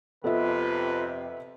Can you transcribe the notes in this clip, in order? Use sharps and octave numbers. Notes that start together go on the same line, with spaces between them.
F2 C3 B3 F4 A4 B4 D#5 E5